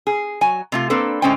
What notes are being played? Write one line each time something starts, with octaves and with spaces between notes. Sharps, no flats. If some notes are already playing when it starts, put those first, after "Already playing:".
G#4
F#3 G#5
C3 A3 F4
A#3 C4 D4 A4 B4
A2 D3 G#3 C#4 C5 G5